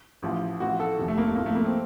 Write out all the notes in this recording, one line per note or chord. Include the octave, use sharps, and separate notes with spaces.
A1 A2 F3
A1 A2 F3 F#4
A4
F1 D#2 D#3
A3
A#3
A3
A#1 A2 F3 A#3
A3
A#3
C4